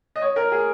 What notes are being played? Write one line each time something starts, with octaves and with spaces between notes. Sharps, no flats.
D#5
C#5
A#4
G#4